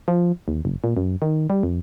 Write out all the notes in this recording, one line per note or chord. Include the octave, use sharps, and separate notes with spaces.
F3
D#2
F#1
A#2
F#2
D#3
G3
F2